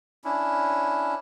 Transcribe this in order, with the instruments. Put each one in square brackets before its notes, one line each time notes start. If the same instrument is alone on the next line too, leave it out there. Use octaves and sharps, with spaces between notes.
[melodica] C#4 D4 E4